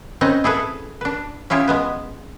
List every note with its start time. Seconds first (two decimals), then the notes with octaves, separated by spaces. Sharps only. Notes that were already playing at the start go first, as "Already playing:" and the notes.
0.21 C4 C#4 D#4 B4 D#5
0.44 E4 G#4 A4 B4
1.01 D4 B4
1.50 C#4 E4 F4 G4 G#4
1.68 G#3 B3 B4